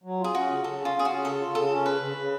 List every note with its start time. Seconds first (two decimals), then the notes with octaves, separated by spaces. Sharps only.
0.03 F#3
0.20 F4 G#4
0.35 C#4 F#4
0.49 C#3
0.64 C#3 A4
0.80 C#4
0.85 F4
0.95 C#4 G#4
1.05 F#4
1.10 C#4
1.25 C#3 A4
1.40 F4
1.55 C#3 A4
1.71 C#4
1.86 C#3 B4
2.01 C#3
2.17 C#3